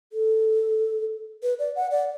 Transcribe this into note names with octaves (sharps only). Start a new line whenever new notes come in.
A4
B4
D5
F#5
D5